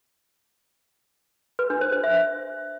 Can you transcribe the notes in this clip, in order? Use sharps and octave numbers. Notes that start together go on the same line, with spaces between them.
B4
D4
C5
C5
E5